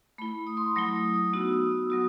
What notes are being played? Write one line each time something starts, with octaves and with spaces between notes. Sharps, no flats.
A3 E4 B5
D#6
C6
F#3 A3 E4 D#6
D#6
D#6
B3 D#4 F#4 E6
D#6
E6
F#3 B3 F#4 D#6